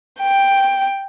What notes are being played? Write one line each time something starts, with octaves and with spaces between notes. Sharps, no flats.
G5